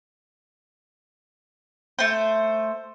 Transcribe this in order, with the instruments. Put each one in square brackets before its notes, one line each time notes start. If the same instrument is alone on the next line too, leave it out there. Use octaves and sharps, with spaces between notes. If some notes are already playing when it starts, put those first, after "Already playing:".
[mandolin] A3 C5